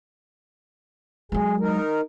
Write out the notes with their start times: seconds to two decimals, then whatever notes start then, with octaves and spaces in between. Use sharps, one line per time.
1.32 F#3 G#3 G#4
1.60 D#4 A#4